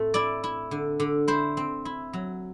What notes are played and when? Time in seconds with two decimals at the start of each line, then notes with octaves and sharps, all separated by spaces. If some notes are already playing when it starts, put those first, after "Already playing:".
Already playing: A2 A3 C4
0.14 E4 D5
0.44 E4
0.71 D3
1.00 D3
1.28 E4 C5
1.57 C4
1.85 E4
2.13 F#3